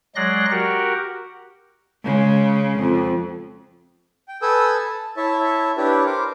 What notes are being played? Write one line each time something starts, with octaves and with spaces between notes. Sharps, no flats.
F#3 G#3 D5 C6 F#6 A#6
F#4 G4 A#4 F#5
C#3 G#3
F2
G5
A4 B4 G#5 D#6 E6 G6
A5
E4 C#5 E5 A5
D4 E4 G4 B4 C#5
A#4 C5 D6